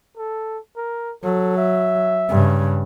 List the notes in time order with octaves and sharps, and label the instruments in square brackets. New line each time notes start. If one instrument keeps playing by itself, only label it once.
[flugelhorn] A4
A#4
[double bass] F#3 [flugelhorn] A4
[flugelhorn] E5
[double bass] G2 C#3